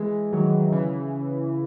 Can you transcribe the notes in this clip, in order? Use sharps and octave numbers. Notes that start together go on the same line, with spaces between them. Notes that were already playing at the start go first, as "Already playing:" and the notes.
Already playing: E3 G#3
D#3 F#3
C#3 E3